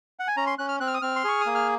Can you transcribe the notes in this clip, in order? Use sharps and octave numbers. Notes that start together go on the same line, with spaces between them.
F#5
G#5
C#4 A#5
C6
C#4 F#6
F6
C4 F#6
F6
D#6
C4 F6
C6
G#4 C#6
D#6
A#3
F6